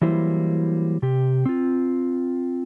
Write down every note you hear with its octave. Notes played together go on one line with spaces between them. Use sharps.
E3 F#3 G3 A#3 E4 C5
C3 G4
C4 F4